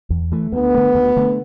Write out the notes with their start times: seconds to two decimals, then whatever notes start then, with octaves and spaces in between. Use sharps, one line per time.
0.10 E2
0.32 E3 A3
0.52 D2 B3
0.74 D3 A3
0.95 D2
1.17 D3 A3